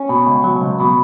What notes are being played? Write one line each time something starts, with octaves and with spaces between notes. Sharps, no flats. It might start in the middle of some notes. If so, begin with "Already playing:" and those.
Already playing: C#4
B2
C#2
F#3
C#2
B2